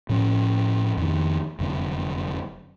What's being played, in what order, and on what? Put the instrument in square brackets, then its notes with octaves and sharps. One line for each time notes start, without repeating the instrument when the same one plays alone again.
[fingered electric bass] A2 F3 C#4
F2 D#3
F1 F#2 D3